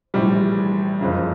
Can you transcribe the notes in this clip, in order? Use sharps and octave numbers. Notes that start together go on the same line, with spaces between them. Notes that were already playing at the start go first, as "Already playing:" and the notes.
A#1 A2 E3 G3
F#1 F2 C#3